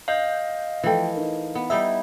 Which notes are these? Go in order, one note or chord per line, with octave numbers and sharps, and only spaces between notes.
D#5 F5 G6
E3 F3 A3 G5
D#4 A#4
B3
G3 D#4 E4 E5